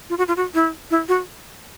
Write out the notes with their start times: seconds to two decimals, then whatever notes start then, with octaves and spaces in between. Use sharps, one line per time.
0.10 F4
0.18 F#4
0.28 F4
0.37 F#4
0.54 E4
0.91 E4
1.08 F#4